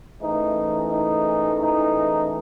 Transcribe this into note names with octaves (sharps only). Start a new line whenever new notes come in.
A1 G#2 E3 A3 D#4
D#4
D#4